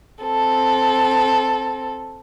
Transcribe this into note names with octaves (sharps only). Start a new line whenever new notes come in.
C4 A4